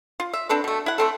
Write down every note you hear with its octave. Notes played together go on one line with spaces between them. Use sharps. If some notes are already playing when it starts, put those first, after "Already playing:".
F4
E5
C4 D4 A4 B4
B2 A3
E4 F#5
A3 C4 A4